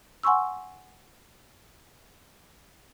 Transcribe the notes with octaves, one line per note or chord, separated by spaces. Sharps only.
F#5 G#5 C6 C#6 E6